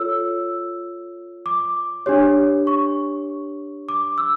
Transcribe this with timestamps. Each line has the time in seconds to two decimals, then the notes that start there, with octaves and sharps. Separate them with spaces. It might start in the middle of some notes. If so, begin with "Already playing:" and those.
Already playing: F4 A4 C#5 E6
1.46 D6
2.06 D4 G4 C#5
2.67 C#6
3.89 D6
4.18 E6